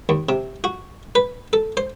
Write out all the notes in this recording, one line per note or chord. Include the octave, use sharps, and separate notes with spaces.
D#2
C3
F#4
B4
A4
C5